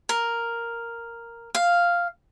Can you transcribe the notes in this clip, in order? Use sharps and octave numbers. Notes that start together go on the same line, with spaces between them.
A#4
F5